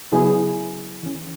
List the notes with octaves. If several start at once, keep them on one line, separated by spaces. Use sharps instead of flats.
C#3 F#3 B3 E4 G#4
E3 C#4